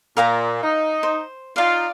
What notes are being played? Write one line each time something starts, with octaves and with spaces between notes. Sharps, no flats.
A#2 A#4 F5 A#5
D#4
C5
D#4 F4 D5 F5